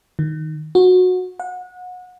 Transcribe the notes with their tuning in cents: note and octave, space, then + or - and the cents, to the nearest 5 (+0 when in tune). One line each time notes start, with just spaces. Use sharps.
D#3 +0
F#4 -20
F#5 -30